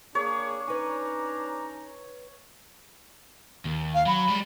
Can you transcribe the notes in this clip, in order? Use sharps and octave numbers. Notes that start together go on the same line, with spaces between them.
A#3 D4 G#4 C#5
C#4 D#4 B4 G#5 A#5
D#2
F5
F#3 B5
G3 G#3